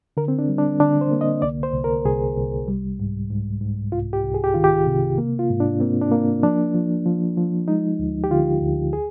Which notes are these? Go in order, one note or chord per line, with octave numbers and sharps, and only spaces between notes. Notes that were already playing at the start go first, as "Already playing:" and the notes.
D3 A#4
C4
D4
G3
D4
D3 D4
C5
A#3
D#5
C2 D5
C5
C2
A#4
C2 G#4
C2
G3
G#2
G#2
G#2
C2 F4
G4
C2
G#4
G4
D#3 F4
G4
C3
A#3
F4
G#2
D4
A#3 C4
D4
A#3
F3 D4
F3
F3
F3
G#3 D#4
D2
G4
D3 F4
D2
G#4